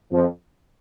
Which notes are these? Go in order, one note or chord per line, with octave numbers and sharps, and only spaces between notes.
F2 F3